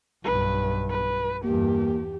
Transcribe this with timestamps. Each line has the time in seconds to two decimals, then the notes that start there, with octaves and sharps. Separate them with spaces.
0.24 B1 G2 B4
0.90 B4
1.44 E2 G2 A#3 G4